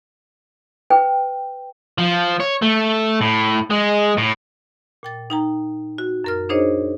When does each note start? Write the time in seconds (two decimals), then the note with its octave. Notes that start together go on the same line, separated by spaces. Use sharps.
0.90 B4 G5
1.98 F3
2.40 C#5
2.62 A3
3.21 A2
3.70 G#3
4.18 A2
5.03 A#2 G5 A6
5.30 D#4 G5 A#5
5.98 F#4
6.24 F#2 A#4 F6
6.49 D4 D#4 G#4 C5 C#5 D#5